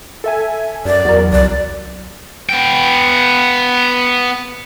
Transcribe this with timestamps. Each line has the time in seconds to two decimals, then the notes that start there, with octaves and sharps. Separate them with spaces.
0.24 A4 E5 G#5
0.85 F#2 D5
1.05 E2 F#3 A#4
1.32 C2 D5
2.49 B3 G5